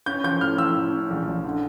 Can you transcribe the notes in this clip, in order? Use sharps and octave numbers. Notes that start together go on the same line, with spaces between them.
C#4 G6
F3 G6
A2 F6
F3 E6
A2
C#4
A#1
A#1
D3